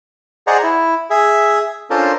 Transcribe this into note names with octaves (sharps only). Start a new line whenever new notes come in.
G#4 C5 D5 D#5 F#5 A#5
E4
G#4 E5
C#4 D4 F4 A4 A#4 C5